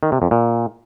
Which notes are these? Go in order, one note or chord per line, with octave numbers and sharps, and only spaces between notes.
D#3
C3
F2
A#2